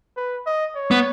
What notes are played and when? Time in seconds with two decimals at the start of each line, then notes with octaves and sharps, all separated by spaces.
0.17 B4
0.46 D#5
0.75 C#5
0.91 B3